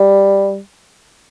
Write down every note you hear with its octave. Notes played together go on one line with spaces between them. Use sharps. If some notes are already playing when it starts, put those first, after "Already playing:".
Already playing: G3